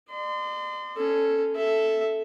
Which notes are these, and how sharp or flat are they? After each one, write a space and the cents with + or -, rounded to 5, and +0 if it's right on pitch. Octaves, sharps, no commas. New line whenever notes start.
D5 +45 C6 -30
C#4 +0 A4 +0
A4 +0 E5 +0